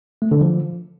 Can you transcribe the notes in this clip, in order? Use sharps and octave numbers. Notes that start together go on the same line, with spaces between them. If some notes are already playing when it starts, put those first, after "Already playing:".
A3
D3
F3